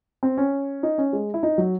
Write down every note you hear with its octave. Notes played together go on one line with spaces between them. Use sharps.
C4
C#4
D#4
C#4
G#3
E4
D#4
F#3